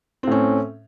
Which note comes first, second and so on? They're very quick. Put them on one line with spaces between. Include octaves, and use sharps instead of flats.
C4 A2 C#4